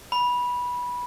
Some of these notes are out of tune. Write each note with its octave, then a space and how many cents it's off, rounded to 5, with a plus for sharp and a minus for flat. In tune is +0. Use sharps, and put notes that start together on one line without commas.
B5 -15